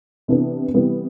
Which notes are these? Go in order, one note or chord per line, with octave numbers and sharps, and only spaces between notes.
C3 E3 B3 D4
C3 E3 G3 B3